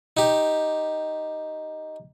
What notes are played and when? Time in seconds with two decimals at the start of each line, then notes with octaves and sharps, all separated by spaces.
0.17 D#4 G4